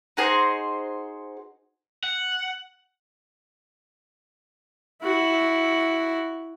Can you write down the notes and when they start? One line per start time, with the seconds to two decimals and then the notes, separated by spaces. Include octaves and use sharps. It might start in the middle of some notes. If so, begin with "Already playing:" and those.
0.17 D#4 F#4 G#4 C5
2.04 F#5
5.02 E4 F#4